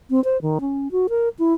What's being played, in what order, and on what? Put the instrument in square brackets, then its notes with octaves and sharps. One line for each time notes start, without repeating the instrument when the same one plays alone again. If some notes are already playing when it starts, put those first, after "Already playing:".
[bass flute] C4
C5
D#3
C#4
F#4
A#4
E4